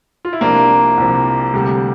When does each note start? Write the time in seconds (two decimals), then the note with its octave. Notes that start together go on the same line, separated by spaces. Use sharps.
0.25 F4
0.33 E4
0.41 C2 C3 F3 A#3 D4
0.98 C2 C3 F3
1.54 D2 C3 G3